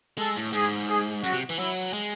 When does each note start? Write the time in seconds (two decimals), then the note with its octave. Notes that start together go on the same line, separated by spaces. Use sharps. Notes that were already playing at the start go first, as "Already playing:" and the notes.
0.18 G#3 A4
0.36 A2
0.53 G#2 G#4
0.88 G#4
1.23 F#2 F#4
1.32 C3
1.50 E3
1.58 F#3 E4
1.93 G#3